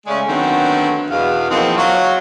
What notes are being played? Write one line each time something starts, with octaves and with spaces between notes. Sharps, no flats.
C#3 G#3 A3 C#4 G#4 D5
D3 D#3 F#3 A3 B3 C4
E2 B2 F5
E2 F3 A#3 C4 D#4
F#3 C#5 F5